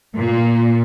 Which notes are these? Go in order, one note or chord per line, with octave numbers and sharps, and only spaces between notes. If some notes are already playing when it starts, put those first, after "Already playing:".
A#2